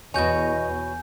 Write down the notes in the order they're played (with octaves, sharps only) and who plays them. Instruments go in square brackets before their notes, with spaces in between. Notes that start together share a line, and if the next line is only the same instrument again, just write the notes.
[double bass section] E2 [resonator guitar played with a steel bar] B2 F#4 C#5 [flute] D#5 [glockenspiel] G#5 G6